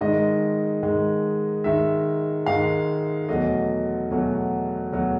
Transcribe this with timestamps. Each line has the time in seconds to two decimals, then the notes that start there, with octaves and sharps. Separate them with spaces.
0.01 G#2 D#3 G#3 D#5
0.83 G#2 D#3 G#3
1.64 G#2 D#3 G#3 E5
2.46 G#2 D#3 G#3 F5
3.28 E2 B2 F#3 A3 D#5
4.11 E2 B2 F#3 A3
4.92 E2 B2 F#3 A3